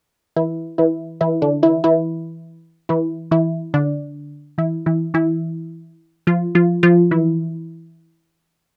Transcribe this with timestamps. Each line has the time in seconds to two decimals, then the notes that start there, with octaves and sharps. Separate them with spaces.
0.36 E3 E4
0.78 E3 E4
1.21 E3 E4
1.42 D3 D4
1.63 E3 E4
1.84 E3 E4
2.89 E3 E4
3.31 E3 E4
3.74 D3 D4
4.58 E3 E4
4.86 E3 E4
5.14 E3 E4
6.27 F3 F4
6.55 F3 F4
6.83 F3 F4
7.11 E3 E4